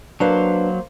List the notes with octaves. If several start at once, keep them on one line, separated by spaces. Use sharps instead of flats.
F#3 A#3 D4 B4 C5 F5